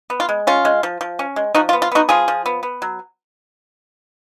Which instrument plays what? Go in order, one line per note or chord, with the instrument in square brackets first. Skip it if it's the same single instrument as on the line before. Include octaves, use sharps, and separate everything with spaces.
[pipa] B3
F4
G#3
C#4 F4
G#3
F3
F3
C#4
G#3
F3 D#4 F#4
F4
B3
F4
B3 D#4 F#4
F3 F4 G#4
F3
B3
B3
F#3